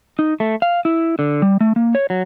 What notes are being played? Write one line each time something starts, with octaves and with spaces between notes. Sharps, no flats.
D#4
A3
F5
E4
D3
G3
A3
A#3
C#5
F#3